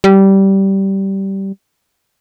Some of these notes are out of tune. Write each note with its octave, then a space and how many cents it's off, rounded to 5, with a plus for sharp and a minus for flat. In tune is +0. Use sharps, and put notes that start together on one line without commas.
G3 -15